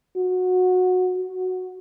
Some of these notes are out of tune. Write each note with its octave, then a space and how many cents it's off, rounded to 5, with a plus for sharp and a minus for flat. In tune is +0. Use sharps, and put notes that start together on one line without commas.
F#4 -15
F#4 +0